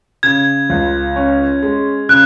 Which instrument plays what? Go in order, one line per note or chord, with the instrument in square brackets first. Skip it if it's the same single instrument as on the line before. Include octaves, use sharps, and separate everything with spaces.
[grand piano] C#3 [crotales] G#6
[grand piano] C#2
C#4
G#3
[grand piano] C#3 [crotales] F#6